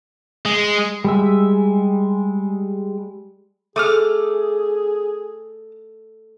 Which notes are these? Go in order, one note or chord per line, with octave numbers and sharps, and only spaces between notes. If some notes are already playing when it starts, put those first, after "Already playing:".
G#3
G3 G#3 E5
A3 G#4 D6 D#6 F6